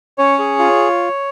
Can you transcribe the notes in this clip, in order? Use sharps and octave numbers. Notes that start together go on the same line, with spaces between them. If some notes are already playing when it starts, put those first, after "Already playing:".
C#4 C#5
G#4
F4